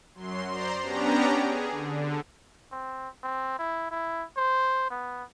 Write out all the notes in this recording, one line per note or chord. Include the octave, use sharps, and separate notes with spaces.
F#2 F#3 C6
C5 D5 A#5 C6
B3 C#4 D4 G4 A#5
G#4
D3
C4
C4
E4
E4
C5
B3